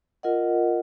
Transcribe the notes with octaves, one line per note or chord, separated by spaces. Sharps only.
F4 A#4 D#5 F#5